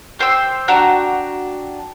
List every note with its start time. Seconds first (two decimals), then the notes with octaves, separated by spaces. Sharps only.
0.19 G4 C5 G5 E6
0.68 D4 F#4 G4 A#5